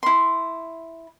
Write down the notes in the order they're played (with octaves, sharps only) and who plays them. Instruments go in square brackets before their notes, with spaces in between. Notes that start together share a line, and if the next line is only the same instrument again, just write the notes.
[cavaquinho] E4 C6